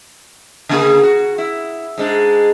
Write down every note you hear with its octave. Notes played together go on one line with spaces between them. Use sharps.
C#3 A#3 G#4
F#4
E4
G#2 G#3 D4